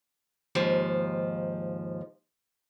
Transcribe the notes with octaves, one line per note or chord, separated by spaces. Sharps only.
D#2 G#2 F3